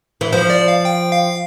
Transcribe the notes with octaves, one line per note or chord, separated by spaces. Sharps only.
E3
F3 C5
D5
F5
G5
F5